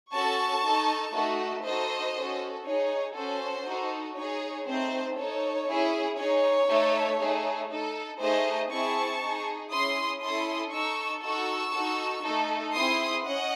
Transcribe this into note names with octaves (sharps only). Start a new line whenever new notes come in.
C#4 F#4 A4 A5 C#6
D#4 A4
A3 D#4 F#4 A4
D#4 F#4 A4 C5 D#5
C#4 F#4 A4
D#4 G#4 C#5
C#4 F#4 A4 C5
D#4 F#4 A4
D#4 G#4 C#5
A3 C4 D#4 C5
D#4 A4 C#5
C#4 E4 G#4
D#4 G#4 C#5
A3 D#4 A4
A3 D#4 G#4
D#4 A4
A3 D#4 G#4 C5 D#5
C4 E4 G#4 A5 C#6
D#4 G#4
C#4 E4 G#4 C6 D#6
C#4 E4 A4 C6 D#6
D#4 A4 C#6 E6
D#4 F#4 A4 C#6 E6
D#4 F#4 A4
A3 D#4 A4
C4 E4 G#4 C6 D#6
C#4 D#5 F#5